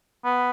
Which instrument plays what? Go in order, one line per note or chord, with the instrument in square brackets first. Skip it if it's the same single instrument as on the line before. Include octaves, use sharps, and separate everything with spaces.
[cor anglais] B3